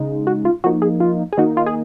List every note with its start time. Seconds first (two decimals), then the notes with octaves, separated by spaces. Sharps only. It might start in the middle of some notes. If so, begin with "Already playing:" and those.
Already playing: C#3 G#3 D#4
0.27 F#4
0.45 F4
0.64 F3 A#3 D#4 F#4
0.82 G#4
1.00 F4
1.33 G#4
1.37 D#3 A#3 D#4 F#4
1.57 F4
1.66 G#4